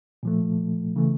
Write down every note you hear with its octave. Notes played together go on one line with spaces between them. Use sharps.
A#2 F3 A3
C#3 E3 A3